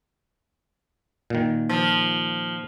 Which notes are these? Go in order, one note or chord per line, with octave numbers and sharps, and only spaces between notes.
A#2 D#3
F3